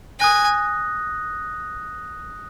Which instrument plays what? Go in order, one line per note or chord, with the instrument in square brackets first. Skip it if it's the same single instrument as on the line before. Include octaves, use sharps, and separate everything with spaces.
[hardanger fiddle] G#5 [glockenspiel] D#6 F#6 A#6